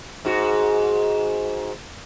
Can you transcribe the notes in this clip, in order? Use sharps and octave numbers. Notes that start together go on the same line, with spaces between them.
G#2 F#4